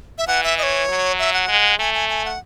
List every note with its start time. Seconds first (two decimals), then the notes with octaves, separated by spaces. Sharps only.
0.18 E5
0.27 E3 F#5
0.43 E5
0.58 D#5
0.63 C#5
0.89 F#3
1.19 E5
1.33 F#5
1.48 G#3
1.79 A3 G#5
1.94 G#5
2.09 G#5
2.25 F#5